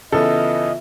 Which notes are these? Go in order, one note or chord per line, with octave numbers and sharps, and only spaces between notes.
C#3 E3 B3 F4 A4 D#5 E5